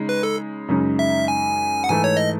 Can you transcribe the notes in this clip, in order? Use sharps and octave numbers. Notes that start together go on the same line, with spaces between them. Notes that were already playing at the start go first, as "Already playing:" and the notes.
Already playing: C#3 G#3 D#4
B4
A4
F#2 C#3 G#3 D#4
E5
G#5
F#5
G#2 E3 A3 G#5
C#5
D#5